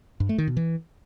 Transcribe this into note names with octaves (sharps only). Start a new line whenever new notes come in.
G2
A3
D#3
B2
E3